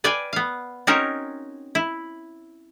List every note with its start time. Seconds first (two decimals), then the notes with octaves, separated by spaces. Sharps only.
0.04 B4 D5 F5 G5 G#5
0.33 B3 F5
0.87 C4 C#4 D#4 F#4 A#4 C#5
1.75 E4